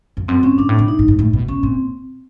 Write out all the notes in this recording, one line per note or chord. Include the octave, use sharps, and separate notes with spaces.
F2
F#2 C4
G2 C#4
G#2 D4
A2
D4
B2
D#4
A2
G#2
A2
B2
B2 C#4
A#2 C4